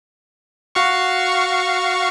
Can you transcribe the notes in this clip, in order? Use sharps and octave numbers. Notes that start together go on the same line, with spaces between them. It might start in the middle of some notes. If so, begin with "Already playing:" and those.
F#4 F5 C#6